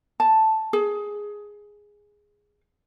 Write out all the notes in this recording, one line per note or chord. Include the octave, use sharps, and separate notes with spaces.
A5
G#4